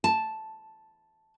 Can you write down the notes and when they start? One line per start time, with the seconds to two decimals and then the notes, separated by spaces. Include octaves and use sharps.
0.04 A5